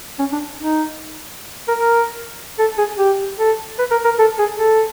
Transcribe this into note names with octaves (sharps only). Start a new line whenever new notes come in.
C#4
D4
D#4
A#4
A#4
A4
G#4
G4
A4
B4
A#4
A#4
A4
G#4
A4